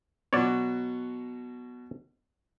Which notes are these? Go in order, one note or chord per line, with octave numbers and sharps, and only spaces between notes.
B2 F#3 C#5 D5